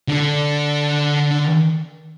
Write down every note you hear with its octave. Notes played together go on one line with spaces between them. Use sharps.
D3 A4